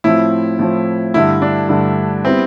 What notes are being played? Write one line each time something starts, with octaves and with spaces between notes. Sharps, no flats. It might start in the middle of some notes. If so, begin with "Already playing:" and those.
A2 F3 C4 E4
A2 F3 C4
G2 D3 A3 E4
D4
G2 D3 A3
G3 B3 C4 E4 B4